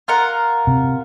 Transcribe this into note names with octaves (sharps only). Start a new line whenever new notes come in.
F4 A#4 F#5
C3